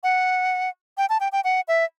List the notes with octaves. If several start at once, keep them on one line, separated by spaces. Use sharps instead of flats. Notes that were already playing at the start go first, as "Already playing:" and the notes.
F#5
G5
A5
G5
G5
F#5
E5